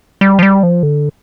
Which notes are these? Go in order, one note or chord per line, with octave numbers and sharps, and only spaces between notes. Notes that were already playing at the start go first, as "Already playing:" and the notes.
G3
F3
G3
F3
D3